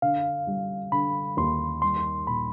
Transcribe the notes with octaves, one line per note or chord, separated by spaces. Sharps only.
D3 F5
G3
D3 B5
D#2 C6
G3 C6
A#2 B5